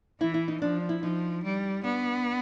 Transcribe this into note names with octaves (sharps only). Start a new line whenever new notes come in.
E3 E4
E4
D#4
F3 D4
E4
F3 D#4
G3
B3 D4